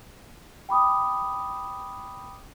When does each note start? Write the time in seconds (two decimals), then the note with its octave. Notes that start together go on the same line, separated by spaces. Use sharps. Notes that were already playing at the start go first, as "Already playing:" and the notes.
0.69 G5 B5 D6 D#6